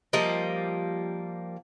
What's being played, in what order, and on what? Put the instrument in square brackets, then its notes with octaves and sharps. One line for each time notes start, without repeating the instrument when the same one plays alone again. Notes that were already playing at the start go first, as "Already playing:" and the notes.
[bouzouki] F3 G3 A#3 D#5